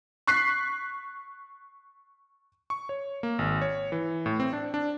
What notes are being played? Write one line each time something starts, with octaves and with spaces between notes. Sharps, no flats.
C#6 F#6 B6 C7
C#6
C#5
A#3
G#1
C#5
E3
A2
C4
D4
D4